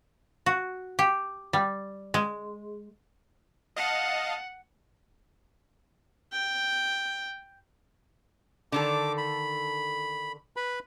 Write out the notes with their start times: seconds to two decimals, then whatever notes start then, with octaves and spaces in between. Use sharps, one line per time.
0.46 F#4
0.99 G4
1.53 G3
2.14 G#3
3.77 D#5 F5 F#5 A5
6.32 G5
8.72 D3 D#3 A4 D6
9.17 B5
10.57 B4 B5